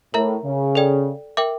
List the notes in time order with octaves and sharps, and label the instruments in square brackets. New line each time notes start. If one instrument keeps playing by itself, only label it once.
[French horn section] A2 [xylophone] A#4 E5 A#5
[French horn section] C#3
[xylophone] A4 D5 G5
A#4 E5 G5 D6